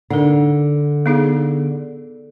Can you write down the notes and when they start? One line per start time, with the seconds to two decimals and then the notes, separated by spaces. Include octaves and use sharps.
0.10 D3 D#4 A#4
1.06 B3 D#4 G#4